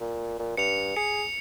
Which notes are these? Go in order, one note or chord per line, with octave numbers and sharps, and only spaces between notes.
A#2
A#2
G2 C#7 F7
G#4 C#7